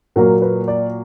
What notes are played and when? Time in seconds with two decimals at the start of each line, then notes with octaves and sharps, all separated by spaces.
0.16 A#2 F#3 A#3 A#4
0.42 B4
0.68 D5